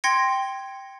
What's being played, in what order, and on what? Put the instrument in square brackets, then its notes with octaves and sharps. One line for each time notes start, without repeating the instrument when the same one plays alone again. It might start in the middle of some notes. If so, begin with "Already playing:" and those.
[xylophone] G5 C6 G#6 A#6 C#7